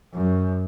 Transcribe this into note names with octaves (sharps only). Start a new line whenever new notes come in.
F#2